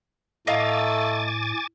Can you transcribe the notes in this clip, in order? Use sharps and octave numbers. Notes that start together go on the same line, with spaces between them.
A2 A3 D#5 F5 G#5 A#5 D6 A6